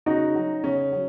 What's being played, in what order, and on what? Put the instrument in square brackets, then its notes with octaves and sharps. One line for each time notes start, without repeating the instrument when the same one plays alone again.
[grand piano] C#3 D#4 F#4
F#3
C#3 C#4
F#3